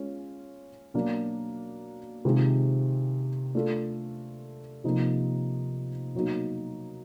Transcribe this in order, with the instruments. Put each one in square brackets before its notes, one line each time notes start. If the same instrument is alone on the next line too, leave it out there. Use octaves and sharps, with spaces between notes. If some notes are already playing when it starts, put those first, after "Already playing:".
Already playing: [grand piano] G#3 C#4 F4
B2 F#3 A#3 D4
C3 D#3 G#3 C4 F4
A3 D4 F4 A4
C3 F3 A#3 D#4
B2 F#3 A#3 D#4